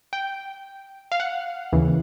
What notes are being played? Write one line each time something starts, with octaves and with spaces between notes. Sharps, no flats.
G5
F5
F#5
D#2 C#3 E3